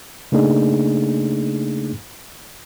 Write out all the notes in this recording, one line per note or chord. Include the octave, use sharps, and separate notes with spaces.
C#3 A3 A#3 D4 D#4 G#4